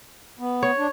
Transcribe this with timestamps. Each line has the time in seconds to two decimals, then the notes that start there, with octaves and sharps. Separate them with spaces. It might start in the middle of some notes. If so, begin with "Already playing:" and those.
0.39 B3
0.63 C#5
0.78 D4